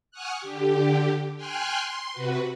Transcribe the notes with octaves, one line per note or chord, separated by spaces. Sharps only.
F#5 G#5 C#6 D#6 F6 F#6
D3 G4
G5 G#5 C6 F6 F#6
C6
C3 F#4 B4